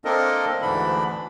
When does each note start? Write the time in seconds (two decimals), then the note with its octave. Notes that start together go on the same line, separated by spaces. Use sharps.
0.05 A#3 C4 D4 A4 A#4 D#5
0.62 D2 G#2 D3 E3 D4 B5